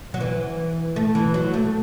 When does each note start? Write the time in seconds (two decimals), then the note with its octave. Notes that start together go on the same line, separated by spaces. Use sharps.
0.14 F#3
0.21 E3
0.96 A3
1.15 E3
1.34 F#3
1.54 A3